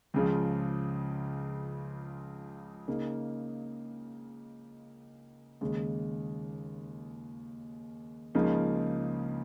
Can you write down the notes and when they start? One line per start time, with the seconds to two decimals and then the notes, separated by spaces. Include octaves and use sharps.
0.14 C#2 C#3 F3
2.88 C#3 A#3 D#4
5.61 D#2 C#3 G#3
8.35 C#2 C#3 F3 A#3 D#4